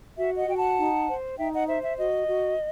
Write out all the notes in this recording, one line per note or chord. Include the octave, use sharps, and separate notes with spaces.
F#4 E5
D#5 F#5
F#4 G5
F#5 A5
D#4
C5
D#4 E5 G5
D#5 F#5
C5 E5
E5
F#4 D#5
F#4